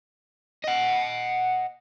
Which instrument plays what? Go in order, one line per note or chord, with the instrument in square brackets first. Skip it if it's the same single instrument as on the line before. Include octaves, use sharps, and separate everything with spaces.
[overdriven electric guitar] D#5 F#5